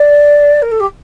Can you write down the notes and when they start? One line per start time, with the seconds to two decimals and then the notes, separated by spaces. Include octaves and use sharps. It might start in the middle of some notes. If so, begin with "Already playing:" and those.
Already playing: D5
0.62 A#4
0.71 A4
0.80 G4